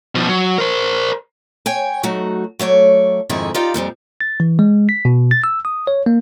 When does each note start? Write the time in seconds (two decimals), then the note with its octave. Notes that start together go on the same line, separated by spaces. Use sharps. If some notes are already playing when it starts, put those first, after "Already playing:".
0.15 B2 F3
0.28 F#3
0.58 A#4 C5
1.66 C#5 G5 G#5
2.03 F#3 A3 D#4 F#4
2.59 F#3 A3 C#5 D5
3.29 F2 G#2 D3 D#3 E4 G#4
3.55 D#4 F4 G4 D5 F5
3.74 F2 A#2 F3 G3
4.21 A6
4.40 E3
4.59 G#3
4.89 B6
5.05 B2
5.31 A6
5.44 E6
5.65 D#6
5.87 C#5
6.06 A#3